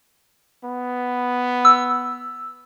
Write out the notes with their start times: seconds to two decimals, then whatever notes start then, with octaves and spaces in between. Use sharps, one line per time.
0.64 B3
1.65 E6